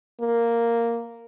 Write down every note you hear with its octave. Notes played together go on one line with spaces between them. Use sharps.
A#3